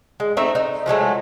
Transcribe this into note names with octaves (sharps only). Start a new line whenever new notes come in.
G#3
A3 C4 D#4 E5
D#4
F3 F#3 G#3 A3